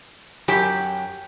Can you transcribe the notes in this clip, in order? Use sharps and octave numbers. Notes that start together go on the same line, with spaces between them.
F#2 F#3 G4